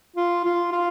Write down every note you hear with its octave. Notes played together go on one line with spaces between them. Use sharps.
F4
F4
F4